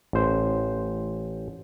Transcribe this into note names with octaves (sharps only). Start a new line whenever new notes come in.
A1 C5